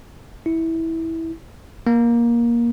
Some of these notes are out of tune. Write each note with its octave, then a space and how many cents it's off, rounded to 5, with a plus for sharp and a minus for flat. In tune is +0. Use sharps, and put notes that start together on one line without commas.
E4 -15
A#3 +15